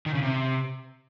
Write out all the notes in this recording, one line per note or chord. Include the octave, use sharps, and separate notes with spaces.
D#3
C#3
C3